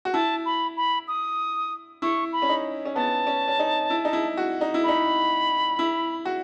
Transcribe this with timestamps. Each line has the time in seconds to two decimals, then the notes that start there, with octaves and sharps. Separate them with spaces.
0.05 F#4
0.13 E4 A5
0.46 B5
0.77 B5
1.08 D#6
2.02 E4 C#6
2.33 B5
2.42 C#4
2.49 D#4
2.85 C#4
2.95 B3 A5
3.27 C#4
3.48 C#4
3.59 D#4
3.90 E4
4.05 D#4
4.13 E4
4.37 F#4
4.61 D#4
4.74 E4
4.84 D#4 B5
5.79 E4
6.25 F#4